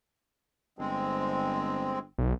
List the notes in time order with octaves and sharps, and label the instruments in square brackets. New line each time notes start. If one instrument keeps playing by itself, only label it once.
[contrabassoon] G1 [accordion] G#3 C4
[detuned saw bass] B1